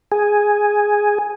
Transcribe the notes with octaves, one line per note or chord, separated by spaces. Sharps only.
G#4